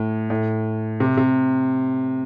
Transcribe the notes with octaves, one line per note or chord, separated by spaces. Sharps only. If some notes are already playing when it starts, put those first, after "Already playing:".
Already playing: A2
A2
C3
C3